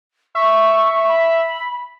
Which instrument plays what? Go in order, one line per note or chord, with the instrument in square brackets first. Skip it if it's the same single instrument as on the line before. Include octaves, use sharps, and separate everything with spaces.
[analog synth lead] E5 [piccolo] C#6
[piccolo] B5